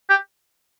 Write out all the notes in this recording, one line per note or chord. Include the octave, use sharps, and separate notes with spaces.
G4